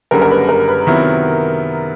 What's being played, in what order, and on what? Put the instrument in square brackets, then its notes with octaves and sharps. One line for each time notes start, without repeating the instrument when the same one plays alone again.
[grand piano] F#1 F#2 D3 G3 [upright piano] A#4
[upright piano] A#4
B4
A#4
B4
[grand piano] C3 D#3 F#3 B3 E4